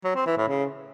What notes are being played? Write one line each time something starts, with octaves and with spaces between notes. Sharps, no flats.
F#3
C4
E3
A2
C#3